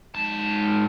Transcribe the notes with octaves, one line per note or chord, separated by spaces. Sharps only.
G#2 A5